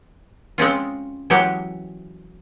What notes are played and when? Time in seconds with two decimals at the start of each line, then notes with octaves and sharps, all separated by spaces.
0.58 G#3 C4 C#4 F4
1.30 E3 F#3 G#3 F#4 G4